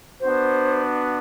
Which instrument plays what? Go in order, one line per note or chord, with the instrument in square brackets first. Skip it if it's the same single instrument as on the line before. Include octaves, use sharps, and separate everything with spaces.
[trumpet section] B3 D4 F#4 [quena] C5